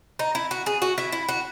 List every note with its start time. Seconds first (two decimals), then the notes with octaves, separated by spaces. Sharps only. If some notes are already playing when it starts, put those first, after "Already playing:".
0.19 D#4
0.35 E4
0.51 F#4
0.66 G#4
0.82 F#4
0.98 E4
1.12 E4
1.29 F#4